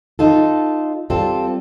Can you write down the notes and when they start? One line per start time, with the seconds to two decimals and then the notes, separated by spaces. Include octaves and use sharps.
0.19 D#4 F4 A4
1.10 G3 C4 F4 A4